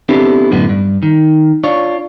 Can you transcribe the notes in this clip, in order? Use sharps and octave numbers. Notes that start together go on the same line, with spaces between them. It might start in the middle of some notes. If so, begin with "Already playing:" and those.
B3 C4 D4 E4 G4 A4
F#2 A2 D3 B3
G2
D#3
D4 F4 C#5